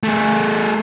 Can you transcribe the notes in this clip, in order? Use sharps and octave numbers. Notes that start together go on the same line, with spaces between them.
A3 G#4